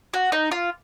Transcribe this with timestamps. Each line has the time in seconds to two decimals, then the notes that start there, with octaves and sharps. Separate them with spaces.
0.14 F#4
0.32 D#4
0.51 F4